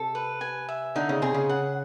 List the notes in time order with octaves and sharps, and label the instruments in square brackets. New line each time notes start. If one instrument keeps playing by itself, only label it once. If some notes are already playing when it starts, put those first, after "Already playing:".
Already playing: [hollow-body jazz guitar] C3 [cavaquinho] A4
[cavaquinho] B4
G#5
E5
[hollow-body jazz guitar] D3 [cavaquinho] D#4
[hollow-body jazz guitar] C#3
[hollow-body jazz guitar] C3 [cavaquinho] G#4
[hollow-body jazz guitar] C#3
[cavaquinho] F#5